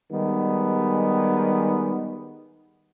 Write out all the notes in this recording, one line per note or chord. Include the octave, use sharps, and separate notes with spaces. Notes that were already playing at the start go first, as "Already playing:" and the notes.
D#3 G3 G#3 B3